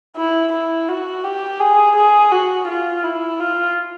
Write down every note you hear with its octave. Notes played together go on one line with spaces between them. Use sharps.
E4
E4
F#4
G4
G#4
G#4
F#4
F4
E4
F4